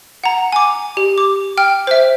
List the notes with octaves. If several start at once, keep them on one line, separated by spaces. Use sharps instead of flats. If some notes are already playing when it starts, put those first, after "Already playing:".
F#5 A#5
G#5 D6
G4
D6
G5 F6
C5 E5